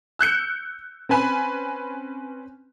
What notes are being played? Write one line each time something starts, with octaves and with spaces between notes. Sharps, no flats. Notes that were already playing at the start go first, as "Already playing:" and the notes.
E6 F#6 G6 C#7
C4 C#4 B4 G#5 B5